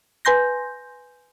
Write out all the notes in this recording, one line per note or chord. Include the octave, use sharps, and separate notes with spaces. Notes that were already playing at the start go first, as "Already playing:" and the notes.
B4 G#5 C6 G6 A#6